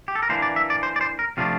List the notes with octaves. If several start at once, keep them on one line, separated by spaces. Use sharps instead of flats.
G4
A4
A#4
E3 A#3 D4 C5
D5
E5
D5
C5
D5
C5
A#4
C3 F3 A3 D4 F4